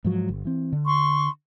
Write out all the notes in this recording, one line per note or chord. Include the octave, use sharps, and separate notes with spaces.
G#2 F3 F#3
G1
E3 C4
D3
C6 C#6